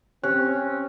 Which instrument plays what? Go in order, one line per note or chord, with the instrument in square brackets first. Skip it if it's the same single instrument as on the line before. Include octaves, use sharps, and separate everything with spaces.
[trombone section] C4 [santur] C#4 [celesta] G4 F#6